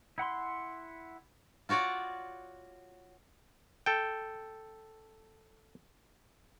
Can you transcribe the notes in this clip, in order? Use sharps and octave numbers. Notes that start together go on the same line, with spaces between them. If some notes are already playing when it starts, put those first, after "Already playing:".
E4 F#5 B5 C6
F4 F#4 C#5 D5 F#5
A4 G5